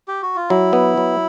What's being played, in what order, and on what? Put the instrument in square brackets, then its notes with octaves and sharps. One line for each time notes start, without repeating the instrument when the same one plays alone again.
[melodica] G4
F#4
F4
[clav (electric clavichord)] F#3 [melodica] E4
[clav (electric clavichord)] B3
F#3